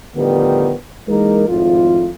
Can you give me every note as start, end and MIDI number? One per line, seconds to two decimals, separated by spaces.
0.16 0.72 45
0.16 0.72 50
0.16 0.72 51
0.16 0.72 53
0.16 0.72 55
0.16 0.72 59
1.09 1.46 52
1.09 1.46 56
1.09 1.46 58
1.09 1.46 63
1.09 1.46 70
1.48 2.10 32
1.48 2.10 41
1.48 2.10 45
1.48 2.10 65